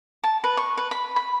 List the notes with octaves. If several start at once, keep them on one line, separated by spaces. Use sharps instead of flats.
A5
B4
C#6
B4
B5
B5